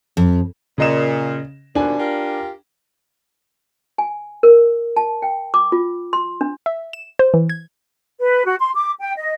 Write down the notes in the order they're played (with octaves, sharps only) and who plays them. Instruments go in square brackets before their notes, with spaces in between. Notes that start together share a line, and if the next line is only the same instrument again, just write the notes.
[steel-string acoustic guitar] F2
[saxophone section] A#2 [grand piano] C#3 D#5 E7
[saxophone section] D#2 B2 F3 [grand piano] D4 G#5
[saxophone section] F4 G4 A#4
[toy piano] G#5
A#4
A5
G5
D6
F4
C6
D4
[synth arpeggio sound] E5
E7
C5
E3
G#6
[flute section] B4
F#4
C6
D6
G5
D#5